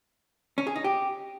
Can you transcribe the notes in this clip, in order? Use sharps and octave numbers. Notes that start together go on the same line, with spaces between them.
C#4
G#4
D#4
G4